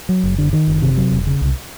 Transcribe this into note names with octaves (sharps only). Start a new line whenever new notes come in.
F#3
F#1
D3
D#3
F#1
C3
F#3
E1
C#3
C2